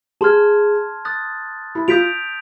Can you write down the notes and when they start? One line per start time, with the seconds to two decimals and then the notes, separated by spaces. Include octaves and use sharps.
0.21 G#4 A5 C6 F6 G#6
1.05 D#6 F#6 A6
1.75 E4
1.88 F4 D#6 G6 B6 D7 F7